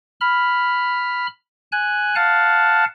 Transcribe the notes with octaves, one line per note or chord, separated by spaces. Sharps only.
B5 F6
G#5 F#6
F5 F#5 A5